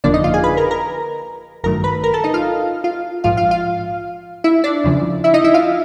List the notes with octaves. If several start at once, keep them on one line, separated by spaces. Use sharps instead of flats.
G1 F2 D3 F3 A#3 D4 D5
D#4 D#5
F4 F5
G#4 G#5
B4 B5
A#4 A#5
A#4 A#5
A1 G2 D#3 F#3 A3 A#4 A#5
B4 B5
A#4 A#5
A4 A5
D#4 D#5
F4 F5
F4 F5
A#1 G#2 F3 F4 F5
F4 F5
F4 F5
E4 E5
D4 D5
D#2 C#3 F3
E4 E5
D#4 D#5
E4 E5
F4 F5